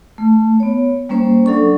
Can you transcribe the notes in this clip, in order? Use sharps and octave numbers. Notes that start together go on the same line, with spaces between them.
A3
B3 C#5
G3 A#3 C#4 C5
F#3 D4 A4 D5 C#6